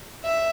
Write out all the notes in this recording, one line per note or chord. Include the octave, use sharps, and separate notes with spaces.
E5